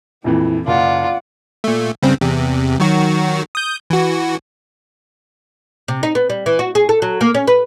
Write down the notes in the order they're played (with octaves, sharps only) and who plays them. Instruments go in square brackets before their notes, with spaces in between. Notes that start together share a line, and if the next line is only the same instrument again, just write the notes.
[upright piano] A#1 F2 E3 [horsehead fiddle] E4
[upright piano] F#1 [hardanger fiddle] F4 [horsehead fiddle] D5 F#5
[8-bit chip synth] A#2 A3
G2 C#3 C4
E2 C3
D#3 F#3 F#4
D#6 G6
E3 F#4
[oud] C3
D#4
B3
G3
E3
F#4
G#4
A4
F#3
A#3
C#4
B4